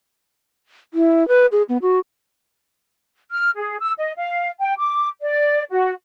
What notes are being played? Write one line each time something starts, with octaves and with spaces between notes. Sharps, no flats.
E4
B4
G#4
B3
F#4
F6
G#4
E6
D#5
F5
G5
D6
D5
F#4